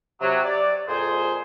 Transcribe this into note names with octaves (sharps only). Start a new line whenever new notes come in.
C3 F#3
D5
F2 A#2 G#4 C5